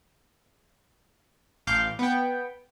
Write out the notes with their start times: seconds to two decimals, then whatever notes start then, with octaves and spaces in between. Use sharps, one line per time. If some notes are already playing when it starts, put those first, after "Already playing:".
1.67 A1 F5 D6 G6
1.99 B3 G5